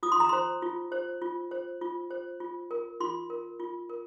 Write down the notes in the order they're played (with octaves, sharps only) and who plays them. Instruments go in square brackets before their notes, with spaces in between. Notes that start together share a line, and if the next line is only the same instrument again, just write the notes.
[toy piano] F4 D#6
C6
A#5
C5 C6
F4
C5
F4
C5
F4
C5
F4
A#4
F4 C6
A#4
F4
A#4